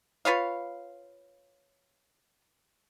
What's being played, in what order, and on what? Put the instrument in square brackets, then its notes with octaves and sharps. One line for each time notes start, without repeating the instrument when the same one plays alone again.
[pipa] F4 B4 C#5 F5